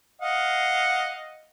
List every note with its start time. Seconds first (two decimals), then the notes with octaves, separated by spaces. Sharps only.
0.22 D#5 F5 F#5